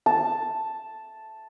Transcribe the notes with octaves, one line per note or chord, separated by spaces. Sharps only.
A5